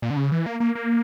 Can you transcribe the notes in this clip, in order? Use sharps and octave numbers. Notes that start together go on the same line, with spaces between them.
A#2
D3
C#3
E3
A#3
A#3
A#3